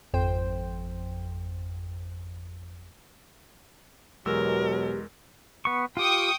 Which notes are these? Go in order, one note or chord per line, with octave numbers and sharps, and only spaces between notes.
G#1 F2 C5 G5
E2 B2 F#3 G#3 G4 A#4 E6
B3 C#6
F4 G4 G5 C#6 D#6